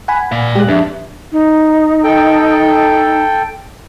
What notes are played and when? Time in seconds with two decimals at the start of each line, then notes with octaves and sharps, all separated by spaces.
0.08 F#5 G#5 B5
0.32 A#2 D5 F5
0.55 G#3 G4 F#6
0.68 F2 D4 B4 E5
1.32 D#4
2.04 A4 G5